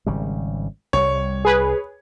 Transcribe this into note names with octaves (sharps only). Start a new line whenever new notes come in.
G#1 C#3 G3
C2 G3 C#5
G#4 B4